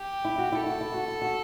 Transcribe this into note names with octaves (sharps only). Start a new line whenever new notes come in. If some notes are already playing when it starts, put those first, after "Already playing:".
Already playing: G4
E4
F#4
E4 A4
F#4
E4
F#4
E4
F#4